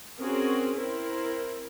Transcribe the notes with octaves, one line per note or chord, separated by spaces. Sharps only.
C4 C#4 F#4 G#4 A#4
C4 E4 A#4 C5